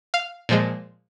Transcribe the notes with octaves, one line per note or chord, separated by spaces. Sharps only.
F5
A#2 F3 G#3